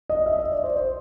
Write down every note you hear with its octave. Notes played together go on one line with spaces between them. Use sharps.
D#5
E5
D#5
D5
C5
C5